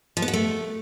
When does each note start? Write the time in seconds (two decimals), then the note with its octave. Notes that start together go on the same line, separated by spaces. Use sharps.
0.17 F3
0.22 B3
0.28 F#4
0.33 A3